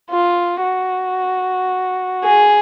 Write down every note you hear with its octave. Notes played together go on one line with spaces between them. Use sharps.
F4
F#4
G#4